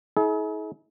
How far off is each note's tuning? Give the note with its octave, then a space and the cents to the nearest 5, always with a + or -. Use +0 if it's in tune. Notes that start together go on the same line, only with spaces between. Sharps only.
E4 -45 G#4 +45